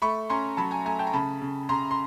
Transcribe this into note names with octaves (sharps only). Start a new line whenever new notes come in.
A3 B5 C#6
C#4 A#5 C6
F#3 A5 B5
G#5 A#5
A3 G#5 A#5
G5 A5
A#5
C#3 A5 B5
C#3
C#3 A#5 C6
C6